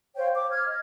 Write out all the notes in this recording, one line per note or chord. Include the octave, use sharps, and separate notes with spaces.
C5 C#5 F5 G5
D6
F6 G#6
D#5